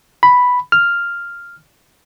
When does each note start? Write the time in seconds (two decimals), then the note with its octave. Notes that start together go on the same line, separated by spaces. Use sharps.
0.23 B5
0.72 F6